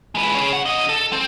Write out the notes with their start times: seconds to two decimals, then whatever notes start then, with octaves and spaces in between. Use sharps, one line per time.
0.15 G#3 B4
0.35 G#4 C#5
0.53 F#5
0.66 D3 D#5
0.89 A4
1.13 C4